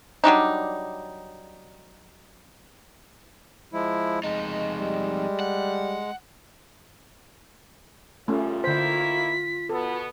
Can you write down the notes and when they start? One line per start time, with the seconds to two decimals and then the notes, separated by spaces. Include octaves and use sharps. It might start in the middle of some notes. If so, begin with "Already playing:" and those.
0.24 F#3 G3 D4 D#4
3.73 F3 G#3 E4
4.24 F2 G#3 D#4
4.79 G3
5.40 F#5
8.28 F#2 C#3 G3 A3 C#4 F4
8.64 D3 D#3 A#3 E4 C5 B6
9.69 B2 B3 A4